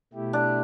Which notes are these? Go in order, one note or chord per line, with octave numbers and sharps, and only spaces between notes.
B2 A3 E4 G4
D4